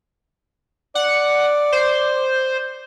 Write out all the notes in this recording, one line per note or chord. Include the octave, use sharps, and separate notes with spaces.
D5 F#5
C5